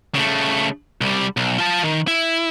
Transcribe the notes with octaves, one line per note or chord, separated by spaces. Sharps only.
C#3 A3
C2 G3
B1
F4 A5
D#3
E4